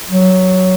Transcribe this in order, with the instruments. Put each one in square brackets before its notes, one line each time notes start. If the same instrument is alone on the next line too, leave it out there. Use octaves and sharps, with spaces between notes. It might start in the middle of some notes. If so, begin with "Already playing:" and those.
[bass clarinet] F#3